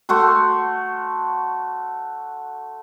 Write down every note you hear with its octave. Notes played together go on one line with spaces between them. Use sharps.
A3 F#4 C6